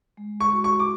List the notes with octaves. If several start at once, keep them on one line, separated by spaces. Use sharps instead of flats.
G#3
C#6
F#4
C#6
D6